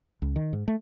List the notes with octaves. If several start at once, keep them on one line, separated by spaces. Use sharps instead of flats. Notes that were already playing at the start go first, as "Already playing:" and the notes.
C#2
D#3
G#2
A3